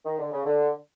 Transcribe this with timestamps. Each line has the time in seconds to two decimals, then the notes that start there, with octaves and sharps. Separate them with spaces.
0.05 D#3
0.19 D3
0.32 C#3
0.45 D3